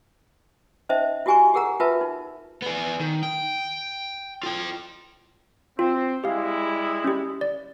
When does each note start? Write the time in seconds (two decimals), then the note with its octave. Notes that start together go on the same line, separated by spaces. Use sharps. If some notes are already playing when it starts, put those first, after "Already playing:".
0.89 C#4 D#4 C5 D#5 E5
1.26 E4 F#4 G4 G#5 A#5 C#6
1.54 G4 G#4 A#4 F#5 A#5
1.80 F4 A#4 B4 E5 A5
2.01 D#4
2.62 B3 G#4
3.00 D#3
3.23 G5
4.43 F4 G5
5.79 C4 F4
6.24 G3 G#3 E4 G4 F5
7.04 C#4 G4
7.41 D5